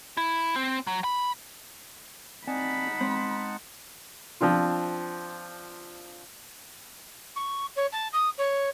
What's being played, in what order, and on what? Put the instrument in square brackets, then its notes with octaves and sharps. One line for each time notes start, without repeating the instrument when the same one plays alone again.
[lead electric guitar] E4
C4
F#3
B5
[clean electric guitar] C4 D5 G#5 [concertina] D#4 F#5 A5 [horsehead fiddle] B5
[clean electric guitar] G#3 [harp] C4
[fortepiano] F3 C4 D4 F4
[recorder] C#6
C#5
A5
D#6
C#5